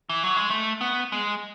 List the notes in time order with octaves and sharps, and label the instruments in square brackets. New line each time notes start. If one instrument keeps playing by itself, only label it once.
[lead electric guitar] E3
F#3
G#3
A3
B3
G#3